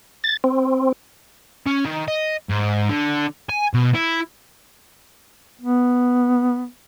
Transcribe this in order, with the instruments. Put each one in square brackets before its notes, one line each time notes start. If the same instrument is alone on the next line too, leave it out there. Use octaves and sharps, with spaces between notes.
[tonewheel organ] A6
C4
[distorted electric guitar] C#4
D#3
D#5
G#2
D3
G#5
B2
E4
[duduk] B3